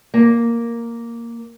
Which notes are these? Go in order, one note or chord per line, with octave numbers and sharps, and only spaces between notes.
A#3